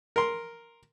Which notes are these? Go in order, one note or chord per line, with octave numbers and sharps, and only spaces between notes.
A#4 C6